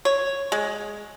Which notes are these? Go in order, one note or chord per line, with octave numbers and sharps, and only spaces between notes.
C#5
G#3